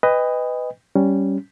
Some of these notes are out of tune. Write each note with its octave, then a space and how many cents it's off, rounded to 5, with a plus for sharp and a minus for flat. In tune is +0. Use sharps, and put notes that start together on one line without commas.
B4 +15 D#5 +0 G5 +40
G3 -10 C#4 +0